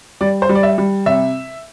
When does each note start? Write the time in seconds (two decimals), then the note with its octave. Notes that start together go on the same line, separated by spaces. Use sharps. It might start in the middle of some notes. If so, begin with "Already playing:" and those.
0.21 G3 D5
0.42 C5
0.49 G3
0.55 D5
0.63 E5
0.78 G3
1.06 C3 E5